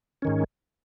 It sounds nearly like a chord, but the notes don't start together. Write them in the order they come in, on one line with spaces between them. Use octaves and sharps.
C#4 D#3 G#2